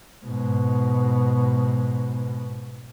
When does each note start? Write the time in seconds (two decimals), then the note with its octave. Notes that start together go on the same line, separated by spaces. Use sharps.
0.25 G#2 B2